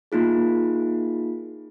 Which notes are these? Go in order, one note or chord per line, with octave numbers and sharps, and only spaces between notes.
A#3 D#4 F4 G#4